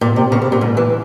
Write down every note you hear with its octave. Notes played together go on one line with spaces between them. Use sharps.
A#2
C3
C#3
C3
A#2
G#2
E3